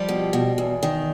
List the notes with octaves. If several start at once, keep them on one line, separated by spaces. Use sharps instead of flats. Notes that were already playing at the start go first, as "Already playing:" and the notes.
Already playing: F3 G3 G4
B2
B2
E2
D#3